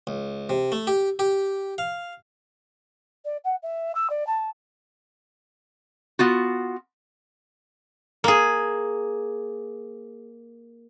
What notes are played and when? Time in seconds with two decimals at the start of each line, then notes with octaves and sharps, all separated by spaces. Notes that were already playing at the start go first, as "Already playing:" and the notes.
0.07 C#2
0.49 C3
0.72 A3
0.87 G4
1.19 G4
1.78 F5
3.25 D5
3.44 F#5
3.62 E5
3.95 E6
4.10 D5
4.27 A5
6.19 B3 F4 F#4
8.24 A#3 G#4